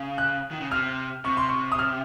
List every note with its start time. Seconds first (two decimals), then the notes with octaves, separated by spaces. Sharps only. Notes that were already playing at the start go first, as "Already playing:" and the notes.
Already playing: C#3
0.18 F#6
0.51 D#3
0.60 C#3
0.71 C3 F6
1.25 C3 C#6
1.37 C6
1.49 C#6
1.72 D#6
1.79 F6